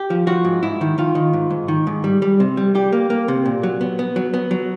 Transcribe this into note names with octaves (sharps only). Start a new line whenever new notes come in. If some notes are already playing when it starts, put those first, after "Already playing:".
Already playing: G4
F3
F3 F#4
G#2
G#2 E4
D#3
D#3 F4
D#3
G#2
G#2
D#3
G#2
G3
G3
C3
G3
G3 G4
A#3
A#3
C3
A#2
F#3
B3
B3
F#3
B3
F#3